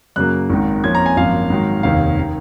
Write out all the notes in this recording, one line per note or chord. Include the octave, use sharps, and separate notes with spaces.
F#2 C#3 F#3 A#3 F#6
G#1 G#2 D#3
F2 F3 A#3 C#4 G#6
A#5
G#5
G#1 F#2 F3 A#3 F5
G#2 D#3 F#3
F1 D#2 D#3 F5
D#3